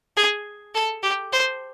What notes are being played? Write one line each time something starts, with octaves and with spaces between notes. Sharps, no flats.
G#4
A4
G4
C5